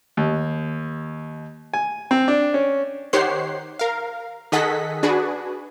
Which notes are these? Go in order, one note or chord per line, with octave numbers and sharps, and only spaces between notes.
D#2
G#5
C4
D4
C#4
D#3 G4 C5 C#5 F#5 C7
A#4 F5
D#3 G#4 A4 D#5 F#5 B6
D4 F#4 G#4 B4